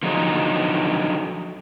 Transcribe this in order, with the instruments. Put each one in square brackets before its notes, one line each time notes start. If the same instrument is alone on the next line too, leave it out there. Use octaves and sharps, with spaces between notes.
[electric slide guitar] D3 F3 F#3 D#4 G#4